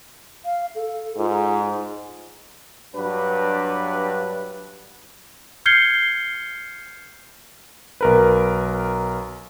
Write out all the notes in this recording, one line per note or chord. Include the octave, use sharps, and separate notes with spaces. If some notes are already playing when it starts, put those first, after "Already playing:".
F5
A4
G#2 F4
G2 F#3 D4 B4
F6 G6 G#6 C7 C#7 G7
B1 A#4 B4